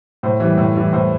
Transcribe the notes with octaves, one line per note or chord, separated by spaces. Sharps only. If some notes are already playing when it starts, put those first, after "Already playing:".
A2 C5
E3 G3
A2
E3 G3
A2 C5